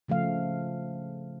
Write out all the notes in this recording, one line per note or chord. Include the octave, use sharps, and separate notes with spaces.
C#3 F3 A3 F5